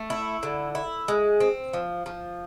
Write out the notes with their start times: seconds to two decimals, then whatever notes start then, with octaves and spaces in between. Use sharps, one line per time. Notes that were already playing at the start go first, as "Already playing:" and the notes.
Already playing: A3
0.10 E4
0.43 D3
0.75 E4
1.08 G#3
1.40 C4
1.73 F3
2.06 F3